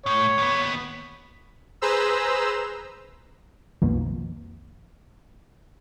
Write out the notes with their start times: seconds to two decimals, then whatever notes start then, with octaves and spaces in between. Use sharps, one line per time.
0.06 A2 C#5
0.38 D#2 B3
1.81 G#4 B4 C5 A#5 E6
3.82 B1 F2 B2 D#3 F3 A#3